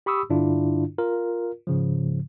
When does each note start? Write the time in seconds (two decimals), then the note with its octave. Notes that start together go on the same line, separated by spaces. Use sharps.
0.06 G4 B5 C#6 D#6 E6
0.30 G2 D3 D4 E4 F4
0.98 F4 A#4
1.67 G#2 C#3 F3